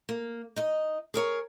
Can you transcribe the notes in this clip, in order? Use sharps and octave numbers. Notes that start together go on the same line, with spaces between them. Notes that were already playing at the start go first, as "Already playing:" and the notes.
A#3
D#4 D#5
G#4 A#4 C#5 A#5